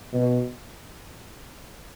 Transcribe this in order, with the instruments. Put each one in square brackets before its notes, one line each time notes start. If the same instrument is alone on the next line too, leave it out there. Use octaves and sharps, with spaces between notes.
[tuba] B2